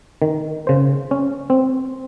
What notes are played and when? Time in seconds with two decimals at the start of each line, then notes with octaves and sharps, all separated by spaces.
0.22 D#3
0.67 C#3 C5
1.11 C#4
1.50 C4